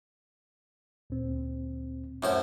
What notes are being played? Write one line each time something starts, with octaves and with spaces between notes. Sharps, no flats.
D2 A#2 C4
F#2 A2 C5